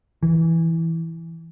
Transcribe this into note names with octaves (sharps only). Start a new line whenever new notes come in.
E3